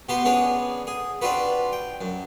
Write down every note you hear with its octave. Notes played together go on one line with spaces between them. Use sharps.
B2 B3 G4 B4 C6
B3 C#4 D4 G#4 C#5
G#4
C4 D4 F4 F#4 B4
G5
F#2